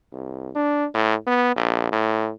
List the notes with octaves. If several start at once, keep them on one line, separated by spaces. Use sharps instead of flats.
C2
D4
A2
B3
A#1
A2